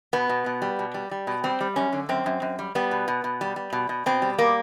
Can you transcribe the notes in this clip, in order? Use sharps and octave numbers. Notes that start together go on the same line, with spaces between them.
B2 B3
B2
B2
G3
B2
G3
G3
B2
G3 C4
G3
F#2 C#4
D3
F#2 C4
F#2
F#2
G3
G3 B3
B2
B2
B2
G3
G3
B2
B2
B2 C4
G3
B2 A#3